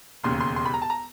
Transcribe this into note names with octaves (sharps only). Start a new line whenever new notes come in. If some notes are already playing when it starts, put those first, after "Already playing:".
E1 D#2 C#3 C6
C6
C6
B5
A#5
A5
A#5